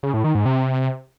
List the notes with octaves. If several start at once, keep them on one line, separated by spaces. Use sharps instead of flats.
C#3
A2
D#3
G#2
C3